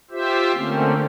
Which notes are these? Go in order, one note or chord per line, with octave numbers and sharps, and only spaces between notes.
F4 G4 C5 E5
D3 A3 A#3 C4 C#4